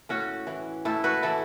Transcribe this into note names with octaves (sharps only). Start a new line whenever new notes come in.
A2 C#4 F#4
E3
A2 E4 A4
F#4 B4
E3 E4 A4